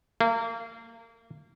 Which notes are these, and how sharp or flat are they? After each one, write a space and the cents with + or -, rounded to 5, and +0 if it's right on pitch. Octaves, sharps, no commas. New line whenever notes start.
A#3 -30